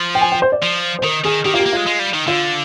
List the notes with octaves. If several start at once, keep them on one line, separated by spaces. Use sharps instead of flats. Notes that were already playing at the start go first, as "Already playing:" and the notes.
Already playing: F3
G5
G#5
G5
C5
D5
F3
C5
D#3 A#4
D#3 G#4
D#3 G4
A#3 F4
G4
A#3
G#3 F4
G#3
G3
D#3
D3 F4